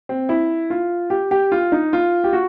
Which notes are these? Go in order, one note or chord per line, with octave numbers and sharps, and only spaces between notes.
C4
E4
F4
G4
G4
F4
D#4
F4
G4
F#4